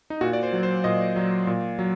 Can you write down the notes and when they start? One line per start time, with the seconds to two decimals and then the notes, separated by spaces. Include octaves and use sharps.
0.10 D#4
0.21 A#2 F#4
0.33 D5
0.43 C5
0.53 F#3
0.63 C5
0.84 A#2 D#5
1.16 F#3
1.47 A#2
1.79 F#3